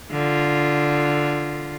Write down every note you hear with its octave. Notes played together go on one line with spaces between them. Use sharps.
D3 F4